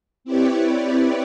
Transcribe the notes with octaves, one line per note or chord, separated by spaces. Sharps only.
C4 E4 G4 B4 C#5 D5